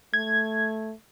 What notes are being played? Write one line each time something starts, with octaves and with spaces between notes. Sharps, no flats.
A3 G#6